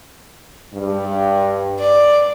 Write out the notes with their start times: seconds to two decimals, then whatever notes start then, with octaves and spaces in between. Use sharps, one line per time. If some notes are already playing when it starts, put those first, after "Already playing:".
0.74 G2
1.80 D5